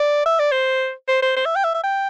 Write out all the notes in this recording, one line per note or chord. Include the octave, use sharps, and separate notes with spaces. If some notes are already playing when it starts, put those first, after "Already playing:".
Already playing: D5
E5
D5
C5
C5
C5
C5
E5
G5
E5
E5
G5